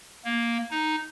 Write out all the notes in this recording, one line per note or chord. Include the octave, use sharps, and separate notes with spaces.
A#3
D#4